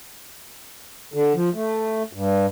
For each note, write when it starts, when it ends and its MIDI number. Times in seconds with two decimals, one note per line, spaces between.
1.14 1.33 50
1.35 1.49 53
1.54 2.03 57
2.13 2.46 43